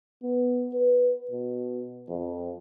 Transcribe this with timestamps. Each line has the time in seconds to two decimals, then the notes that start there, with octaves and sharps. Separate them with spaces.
0.23 B3
0.73 B4
1.31 B2
2.09 F2